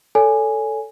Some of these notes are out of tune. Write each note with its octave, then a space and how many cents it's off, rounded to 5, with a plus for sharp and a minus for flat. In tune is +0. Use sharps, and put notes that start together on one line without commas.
A4 +5 C#5 +30 G#5 +0